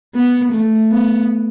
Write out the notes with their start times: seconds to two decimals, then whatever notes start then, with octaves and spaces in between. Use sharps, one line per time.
0.15 B3
0.52 A3
0.91 B3